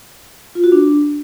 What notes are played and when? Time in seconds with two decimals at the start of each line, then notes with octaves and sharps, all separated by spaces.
0.55 F4
0.64 F#4
0.72 D4